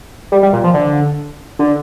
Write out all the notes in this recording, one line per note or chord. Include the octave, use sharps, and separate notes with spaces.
G3
G3
A#2
F3
D3
D3